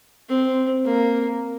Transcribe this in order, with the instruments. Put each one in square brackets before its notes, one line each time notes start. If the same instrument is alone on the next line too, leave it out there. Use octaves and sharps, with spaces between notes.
[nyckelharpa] C4
A#3